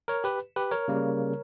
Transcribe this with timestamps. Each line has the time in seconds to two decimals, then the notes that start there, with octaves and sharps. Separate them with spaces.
0.08 A#4 C#5
0.24 G4 B4
0.56 G4 B4
0.71 A#4 C#5
0.88 C#3 G3 A#3